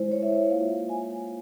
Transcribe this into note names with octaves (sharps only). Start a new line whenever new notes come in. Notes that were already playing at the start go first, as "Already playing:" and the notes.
Already playing: G#3 E4 C5
C#5
E5
C#5
A#3 F4 F5
G#5